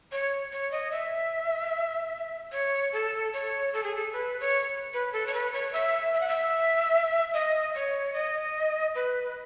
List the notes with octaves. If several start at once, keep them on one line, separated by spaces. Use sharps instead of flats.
C#5
C#5
D#5
E5
C#5
A4
C#5
A4
G#4
A4
B4
C#5
B4
A4
C#5
B4
C#5
E5
E5
F#5
E5
D#5
C#5
D#5
B4